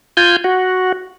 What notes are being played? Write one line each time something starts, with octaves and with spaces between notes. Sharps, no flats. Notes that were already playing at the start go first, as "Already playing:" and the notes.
F4 G#5 G6
F#4